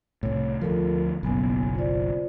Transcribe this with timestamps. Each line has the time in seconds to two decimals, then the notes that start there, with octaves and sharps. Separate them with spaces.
0.23 C2 A2 C#5
0.61 D2 F3 F4 A4 A#4
1.23 F#1 B1 A#3 B3 G#5
1.75 F4 C5 D5